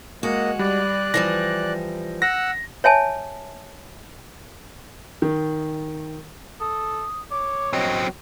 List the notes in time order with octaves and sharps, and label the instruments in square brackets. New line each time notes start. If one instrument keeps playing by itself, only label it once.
[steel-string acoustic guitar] G#3 F#4 [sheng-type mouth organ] A#3 D#5 F#5
[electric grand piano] G3 [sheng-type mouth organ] D5 F#6
[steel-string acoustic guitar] E3 F3 G3 [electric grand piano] A#6
[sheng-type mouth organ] F#5 E6 F#6 [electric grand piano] A#6
[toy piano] C#5 E5 G#5 A5
[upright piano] D#3
[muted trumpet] A4 [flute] D#6
[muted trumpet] C#5 [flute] D6
[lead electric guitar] F#3 C4 [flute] D#5